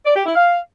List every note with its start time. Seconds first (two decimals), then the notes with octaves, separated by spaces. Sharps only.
0.06 D5
0.16 G4
0.26 E4
0.36 F5